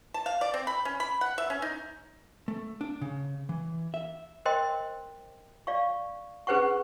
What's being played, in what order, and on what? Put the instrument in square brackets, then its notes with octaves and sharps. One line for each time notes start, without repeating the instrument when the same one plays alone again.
[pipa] A5
F5
D5
C4
B5
C#4
B5
F#5
E5
C#4
D#4
[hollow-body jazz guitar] A3
D4
C#3
E3
E5
[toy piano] A#4 C5 D#5 G5 C6
D5 F5 C#6
C#4 G#4 B4 C5 F#5 C#6